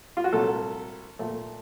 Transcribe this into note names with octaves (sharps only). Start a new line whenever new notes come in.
F4
F#4
C2 A#2 F#3 A3 A4
A#2 A3